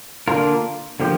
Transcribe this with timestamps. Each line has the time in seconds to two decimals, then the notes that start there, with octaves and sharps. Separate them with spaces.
0.28 D3 A#3 D4 F4 A#4
1.00 D3 F3 A#3 G4